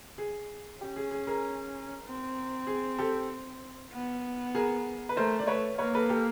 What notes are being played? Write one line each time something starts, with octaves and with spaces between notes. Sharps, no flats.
G#4
C#4 G4
G#4
G#4
G#4 A#4
C4
G#4
G4 A4
B3
G#4 A#4
B4
A3 A#4 C5
D5
A3 B4 C#5
A#3 B4 C#5
A4 B4
G4 A4